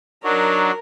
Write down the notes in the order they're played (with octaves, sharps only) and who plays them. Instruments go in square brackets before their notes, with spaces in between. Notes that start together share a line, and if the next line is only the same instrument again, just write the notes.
[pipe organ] F#3 D4 [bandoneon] D#4 F#4 [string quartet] A#4